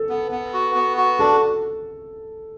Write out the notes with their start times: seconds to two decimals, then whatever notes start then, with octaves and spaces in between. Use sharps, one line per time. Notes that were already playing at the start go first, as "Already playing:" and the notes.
Already playing: A4
0.09 B3
0.31 B3
0.54 F#4
0.75 B3
0.97 F#4
1.19 D4 A4